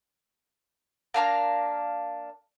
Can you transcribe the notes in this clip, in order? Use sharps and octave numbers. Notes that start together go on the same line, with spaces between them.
A#3 D4 F5 A#5